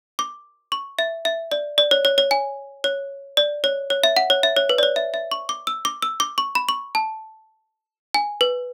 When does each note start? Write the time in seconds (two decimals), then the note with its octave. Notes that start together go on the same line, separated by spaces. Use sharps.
0.19 D6
0.72 C#6
0.99 E5
1.25 E5
1.51 D5
1.78 D5
1.91 C#5
2.05 C#5
2.18 C#5
2.31 G#5
2.84 C#5
3.37 D5
3.64 C#5
3.90 C#5
4.04 E5
4.17 F#5
4.30 C#5
4.43 E5
4.56 C#5
4.69 B4
4.78 D5
4.83 C#5
4.96 E5
5.14 E5
5.31 C#6
5.49 D6
5.67 E6
5.85 D6
6.02 E6
6.20 D6
6.38 C#6
6.55 B5
6.69 C#6
6.95 A5
8.14 G#5
8.41 B4